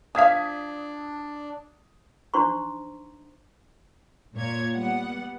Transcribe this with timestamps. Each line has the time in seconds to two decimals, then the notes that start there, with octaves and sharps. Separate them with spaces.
0.15 F3 D4 F5 D#6 G#6 B6
2.34 D4 D#4 C5 A#5 C6 C#6
4.35 A#2 C#5 G#6
4.75 G3 B3 F#5